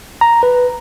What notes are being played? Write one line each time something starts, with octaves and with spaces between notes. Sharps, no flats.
A#5
B4